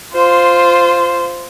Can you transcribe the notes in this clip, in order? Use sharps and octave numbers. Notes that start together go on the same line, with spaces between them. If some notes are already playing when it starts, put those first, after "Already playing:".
F4 C5